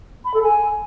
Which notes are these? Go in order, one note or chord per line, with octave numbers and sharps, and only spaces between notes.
B5
A4
G#5